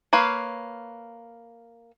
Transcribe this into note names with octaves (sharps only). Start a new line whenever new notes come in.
A#3 B4 C#5 F5